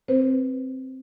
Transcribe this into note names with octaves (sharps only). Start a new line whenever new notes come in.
C4 B4 C5